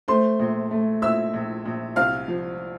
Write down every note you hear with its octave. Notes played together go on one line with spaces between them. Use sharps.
A3 C5 C6
A#1
A3
A#2 E5 E6
A#1
A#1
C2 F5 F6
F3